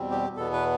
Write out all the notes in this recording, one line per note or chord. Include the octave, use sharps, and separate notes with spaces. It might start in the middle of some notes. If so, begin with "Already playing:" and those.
Already playing: E2 B2 G3 C4
G4
E2 B2 B3 A4
B4